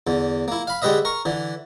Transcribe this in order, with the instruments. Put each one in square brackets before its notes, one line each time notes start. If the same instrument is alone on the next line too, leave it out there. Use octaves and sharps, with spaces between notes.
[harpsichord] E2 D3
A#3 E4
F5 B5
D3 G#3 G4 B4 D#5 E5
A#4 C#6
D3 E3